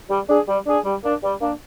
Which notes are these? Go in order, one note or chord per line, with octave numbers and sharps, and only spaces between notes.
G3
D4 G#4
G3
D4 G#4
G3
A#3 D4
G3
A#3 D4